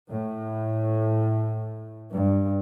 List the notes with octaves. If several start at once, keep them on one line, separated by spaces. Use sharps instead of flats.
A2
G2